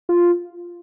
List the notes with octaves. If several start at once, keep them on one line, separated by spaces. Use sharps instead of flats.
F4